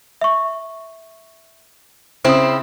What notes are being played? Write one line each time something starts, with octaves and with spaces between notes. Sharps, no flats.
E5 C#6
C#3 C4 E4 C5 D#6